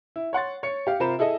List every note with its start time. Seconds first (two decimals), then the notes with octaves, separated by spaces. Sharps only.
0.16 E4
0.33 C#5 F#5 C6 A6
0.63 C#5 C#7
0.87 G4 F5
1.00 C3 F4 A#4 C5 B5 E7
1.19 E4 G#4 A4 D#5